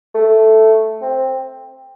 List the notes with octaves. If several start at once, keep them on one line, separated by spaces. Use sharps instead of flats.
A3
C4